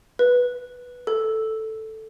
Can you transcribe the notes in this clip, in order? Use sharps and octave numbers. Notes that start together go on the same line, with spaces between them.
B4
A4